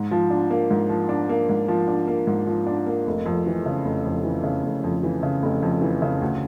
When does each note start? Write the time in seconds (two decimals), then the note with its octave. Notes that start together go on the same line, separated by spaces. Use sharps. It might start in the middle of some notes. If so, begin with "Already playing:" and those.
Already playing: G#2
0.11 F3
0.30 D4
0.50 A#3
0.71 G#2
0.89 F3
1.09 D4
1.29 A#3
1.49 G#2
1.68 F3
1.88 D4
2.07 A#3
2.27 G#2
2.47 F3
2.66 D4
2.87 A#3
3.07 F1
3.26 F2
3.46 E3
3.66 C#3
3.85 F1
4.05 F2
4.24 E3
4.44 C#3
4.63 F1
4.83 F2
5.03 E3
5.23 C#3
5.43 F1
5.62 F2
5.81 E3
6.02 C#3
6.22 D2